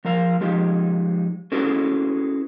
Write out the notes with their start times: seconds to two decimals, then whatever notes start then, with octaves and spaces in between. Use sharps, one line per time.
0.05 F3 A#4 F5
0.41 F3 G#3 D#4 G4
1.52 C#4 E4 F#4 G#4 A4 B4